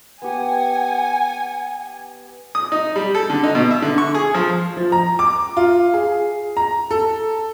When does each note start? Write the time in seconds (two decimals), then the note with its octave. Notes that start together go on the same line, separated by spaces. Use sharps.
0.22 B3 G4 F#5 G#5
2.55 D#6
2.72 D#4
2.96 G3
3.15 A4
3.30 D3
3.44 D#4
3.55 B2
3.71 E5
3.82 D3
3.98 C#6
4.14 G#4
4.35 F3
4.77 F3
4.92 A#5
5.19 D6
5.57 F4
5.94 G#4
6.57 A#5
6.91 A4